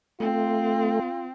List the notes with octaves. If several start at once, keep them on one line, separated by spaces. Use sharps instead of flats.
A3 C4 F4